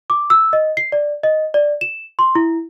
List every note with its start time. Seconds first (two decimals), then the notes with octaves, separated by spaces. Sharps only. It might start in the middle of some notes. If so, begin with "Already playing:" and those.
0.10 D6
0.30 E6
0.53 D#5
0.77 C7
0.92 D5
1.23 D#5
1.54 D5
1.81 E7
2.19 C6
2.35 E4